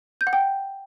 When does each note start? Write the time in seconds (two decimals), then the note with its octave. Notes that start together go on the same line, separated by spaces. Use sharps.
0.21 G6
0.27 F#5
0.33 G5